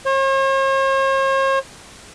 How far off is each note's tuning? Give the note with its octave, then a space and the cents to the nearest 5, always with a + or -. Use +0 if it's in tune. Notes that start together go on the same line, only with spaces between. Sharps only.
C#5 -45